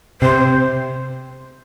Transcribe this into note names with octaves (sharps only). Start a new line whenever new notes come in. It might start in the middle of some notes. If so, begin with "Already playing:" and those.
C3 C5